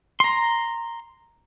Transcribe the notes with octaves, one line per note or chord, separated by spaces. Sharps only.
A#5 C6